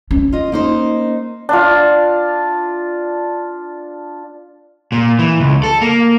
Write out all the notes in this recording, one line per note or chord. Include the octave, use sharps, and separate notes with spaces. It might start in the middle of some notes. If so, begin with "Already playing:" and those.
C#4
F4 D#5
A#3 D#4 C5
D4 F4
A#2
E3
C#2
A4
A#3